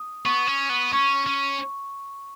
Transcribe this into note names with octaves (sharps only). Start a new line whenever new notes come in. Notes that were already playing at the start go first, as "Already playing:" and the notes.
Already playing: D#6
B3 C#6
C#4
B3
C#4 C#6
C#4